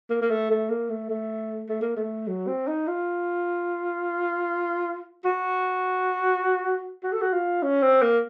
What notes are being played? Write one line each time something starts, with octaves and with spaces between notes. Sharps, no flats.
A#3
A#3
A3
A3
A#3
A3
A3
A3
A#3
A3
F#3
C4
D#4
F4
F#4
F#4
A4
F#4
F4
C#4
C4
A#3